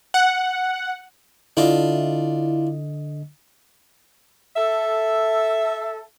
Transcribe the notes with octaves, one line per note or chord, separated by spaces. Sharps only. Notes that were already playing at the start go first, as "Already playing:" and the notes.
F#5
D3 D4 E4 F4 D#5
A4 E5